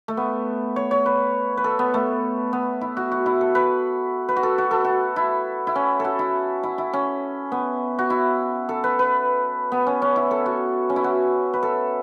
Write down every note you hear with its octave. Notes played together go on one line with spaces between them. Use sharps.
A3
B3
C#5
C#5
B4
B4
A4
B3
A3
B3
E4
F#4
F#4
E4
A4
B4
B4
F#4
A4
F#4
A4
F#4
E4
E4
C#4
F#4 A4
E4
E4
E4
C#4
B3
F#4
E4
A4
B4
B4
B3
C#4
C#4
E4
A4
F#4
C#4
E4
F#4
B4
A4